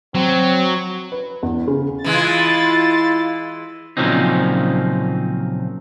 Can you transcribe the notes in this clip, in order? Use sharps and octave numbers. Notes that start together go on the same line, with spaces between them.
F#3 C4
B4
E2
C#3
E3 G#3 E4 F4 A6
A#2 C#3 F3 F#3 C4 D#4